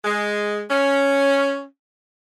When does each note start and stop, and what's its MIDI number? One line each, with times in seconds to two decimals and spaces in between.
0.05 0.62 56
0.69 1.63 61